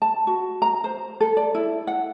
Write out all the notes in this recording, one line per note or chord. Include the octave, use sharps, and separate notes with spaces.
A5
F#4
A#5
C5
A4
D5
E4
F#5